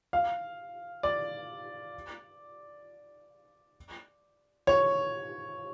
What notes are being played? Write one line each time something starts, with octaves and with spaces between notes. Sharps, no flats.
F5
D5
C#5